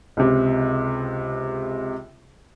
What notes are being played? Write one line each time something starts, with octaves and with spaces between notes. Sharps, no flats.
C#2 C3